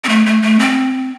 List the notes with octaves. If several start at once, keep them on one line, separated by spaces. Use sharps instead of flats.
C4
A3
A3
A3
C4